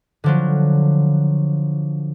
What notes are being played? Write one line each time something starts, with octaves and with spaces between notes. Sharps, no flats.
D3 F3 F#3